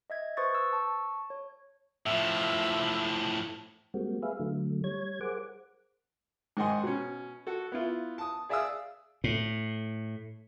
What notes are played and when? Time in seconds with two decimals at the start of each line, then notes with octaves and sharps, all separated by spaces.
0.10 D#5 E5 G#6
0.37 B4 C5 C#6 D#6 A6
0.55 E6
0.70 A5 C#6
1.30 C#5
2.06 A2 F3 E5
3.94 G3 G#3 A#3 C4 F#4
4.22 G#4 B4 E5 F5
4.39 D3 F#3 A3
4.84 G3 C#5 G#6
5.21 G#4 A#4 C5 F#5 D6
6.57 G#2 D#3 D#5 F#5 G#5 C6
6.83 B2 C#4
7.47 F#4 A4
7.72 B3 E4 F4
8.18 A5 D#6
8.49 G#4 D5 E5 F5 D#6 E6
9.24 A2